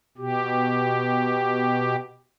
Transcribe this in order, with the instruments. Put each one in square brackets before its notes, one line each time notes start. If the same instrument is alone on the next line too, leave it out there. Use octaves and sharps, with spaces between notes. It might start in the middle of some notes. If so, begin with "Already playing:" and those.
[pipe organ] B2 G4